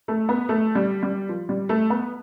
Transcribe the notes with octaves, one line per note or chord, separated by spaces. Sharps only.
A3
B3
A3
G3
G3
F3
G3
A3
B3